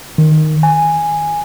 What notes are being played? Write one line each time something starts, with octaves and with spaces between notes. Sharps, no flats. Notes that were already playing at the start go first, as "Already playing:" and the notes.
D#3
G#5